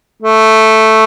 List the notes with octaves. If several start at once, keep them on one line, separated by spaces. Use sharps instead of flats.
A3